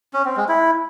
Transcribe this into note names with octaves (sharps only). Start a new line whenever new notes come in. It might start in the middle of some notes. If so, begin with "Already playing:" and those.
C#4
C4
G#3
E4